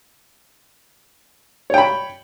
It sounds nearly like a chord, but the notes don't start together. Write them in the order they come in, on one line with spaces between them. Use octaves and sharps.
C#5 G5 B5